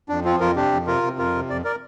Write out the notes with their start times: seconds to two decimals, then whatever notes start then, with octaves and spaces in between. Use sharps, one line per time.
0.09 F2 D4
0.25 F3 C4 F4
0.40 F2 F4 A#4
0.56 C3 D4 G4
0.72 F2
0.87 C3 F4 A#4
1.03 C3
1.18 F2 F4 A#4
1.35 C3
1.50 F2 D5
1.64 A#4 D5